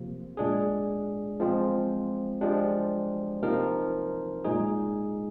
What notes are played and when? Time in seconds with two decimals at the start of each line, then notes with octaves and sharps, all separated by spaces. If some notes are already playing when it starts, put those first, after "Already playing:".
Already playing: C3 F3 A#3
0.37 A#2 G#3 D4 G#4
1.40 F3 G#3 C4 F4
2.41 F3 G#3 D4 G4
3.42 C3 F3 A#3 D#4 A#4
4.44 A#2 G#3 D#4 G#4